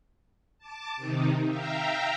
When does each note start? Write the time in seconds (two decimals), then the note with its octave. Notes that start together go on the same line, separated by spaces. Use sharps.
0.59 A5 D6
0.96 C3 D#3 D#4
1.46 E5 F5 G5 A#5